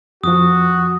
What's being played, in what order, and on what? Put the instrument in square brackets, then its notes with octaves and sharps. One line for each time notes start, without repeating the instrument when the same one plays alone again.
[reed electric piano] F2 F3 [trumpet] F#4 [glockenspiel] D#6